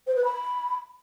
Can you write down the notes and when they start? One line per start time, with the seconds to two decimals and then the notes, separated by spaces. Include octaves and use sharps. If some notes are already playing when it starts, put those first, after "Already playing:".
0.07 C5
0.15 B4
0.24 B5